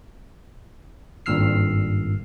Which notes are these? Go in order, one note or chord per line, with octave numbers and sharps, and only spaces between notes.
G#1 G2 A#2 E6 F6 C7